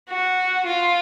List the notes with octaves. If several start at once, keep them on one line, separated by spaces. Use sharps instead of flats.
F#4
F4